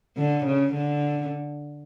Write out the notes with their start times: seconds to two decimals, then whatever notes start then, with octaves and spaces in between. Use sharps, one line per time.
0.17 D3
0.46 C#3
0.74 D3